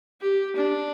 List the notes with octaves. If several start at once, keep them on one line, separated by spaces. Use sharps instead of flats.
G4
D4